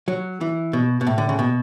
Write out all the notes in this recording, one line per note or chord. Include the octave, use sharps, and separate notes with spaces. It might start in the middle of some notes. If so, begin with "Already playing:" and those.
F#3
E3
B2
B2
A2
D3
C#3
B2